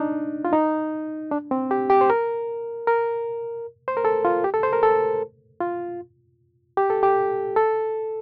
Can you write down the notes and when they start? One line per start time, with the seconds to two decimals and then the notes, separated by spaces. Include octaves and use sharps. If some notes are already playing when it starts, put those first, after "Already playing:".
Already playing: D4 D#4
0.45 F4
0.53 D#4
1.31 D4
1.51 C4
1.71 G4
1.90 G4
2.01 C5
2.10 A#4
2.87 A#4
3.88 C5
3.97 A#4
4.05 A4
4.25 F4
4.44 G4
4.54 A4
4.63 C5
4.73 A#4
4.83 A4
5.61 F4
6.77 G4
6.90 A4
7.03 G4
7.56 A4